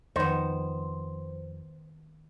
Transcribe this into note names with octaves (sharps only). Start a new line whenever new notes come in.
F2 D#3 B3 C5